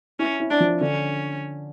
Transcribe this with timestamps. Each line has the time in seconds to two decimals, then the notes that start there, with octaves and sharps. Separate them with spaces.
0.19 C#4 E4
0.40 E4
0.50 D4
0.60 F3
0.81 D3 C#4